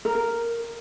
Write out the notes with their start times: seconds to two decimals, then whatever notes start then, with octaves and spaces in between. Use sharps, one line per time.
0.05 A#4